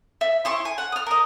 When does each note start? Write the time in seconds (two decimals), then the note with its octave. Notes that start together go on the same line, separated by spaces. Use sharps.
0.21 E5
0.45 E4 C6 C#6
0.65 G#5
0.78 F#5
0.92 D#6 F6
1.07 A#4 D#5